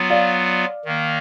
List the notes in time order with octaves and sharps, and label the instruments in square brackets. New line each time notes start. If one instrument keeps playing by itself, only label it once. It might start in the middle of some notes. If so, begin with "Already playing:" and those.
Already playing: [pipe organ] F#3 B3 F4
[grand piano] D5 F5
[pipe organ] D#3 A#3